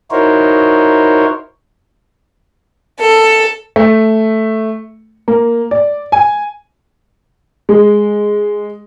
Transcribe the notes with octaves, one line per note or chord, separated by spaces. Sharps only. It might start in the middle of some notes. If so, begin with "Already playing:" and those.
D#4 E4 F#4 A#4 C5 C#5
A4
A3
A#3
D5
G#5
G#3